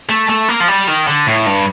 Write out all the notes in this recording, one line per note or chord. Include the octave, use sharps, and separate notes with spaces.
A3
A3
A#3
F3
G3
D#3
D3
A2
G2